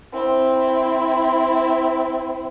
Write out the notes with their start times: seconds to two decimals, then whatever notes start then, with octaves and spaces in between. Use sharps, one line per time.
0.13 C4 E4